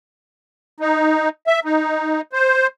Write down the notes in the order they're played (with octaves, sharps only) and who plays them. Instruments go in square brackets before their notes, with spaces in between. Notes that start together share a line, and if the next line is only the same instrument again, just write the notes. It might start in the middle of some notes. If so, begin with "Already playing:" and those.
[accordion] D#4
E5
D#4
C5